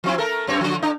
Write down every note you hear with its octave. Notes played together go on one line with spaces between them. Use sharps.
F3 C4 E4
A3 A4 A#4
F#2 C4 C#5
D3 F3
A2 D4